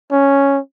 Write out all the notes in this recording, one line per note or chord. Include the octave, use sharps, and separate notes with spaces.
C#4